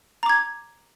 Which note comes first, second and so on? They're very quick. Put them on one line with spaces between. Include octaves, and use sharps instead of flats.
A#5 D6 G#6